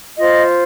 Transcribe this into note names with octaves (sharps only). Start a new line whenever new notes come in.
F4 C5 D#5